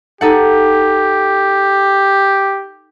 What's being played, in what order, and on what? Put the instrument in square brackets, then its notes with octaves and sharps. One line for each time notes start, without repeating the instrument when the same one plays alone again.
[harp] D#4 A4 F#5 [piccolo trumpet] G4